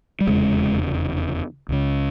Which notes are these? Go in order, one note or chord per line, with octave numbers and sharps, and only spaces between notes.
G3
F1 E2 C#3 G#3
C#2 C#3